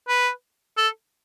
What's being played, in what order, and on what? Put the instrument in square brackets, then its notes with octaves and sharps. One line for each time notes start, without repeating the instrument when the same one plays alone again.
[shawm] B4
A4